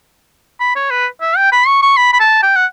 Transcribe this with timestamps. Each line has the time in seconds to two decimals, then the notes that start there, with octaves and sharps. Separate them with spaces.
0.60 B5
0.75 C#5
0.90 B4
1.21 E5
1.37 G5
1.52 B5
1.67 C#6
1.82 C#6
1.97 B5
2.13 B5
2.20 A5
2.43 G5
2.56 F#5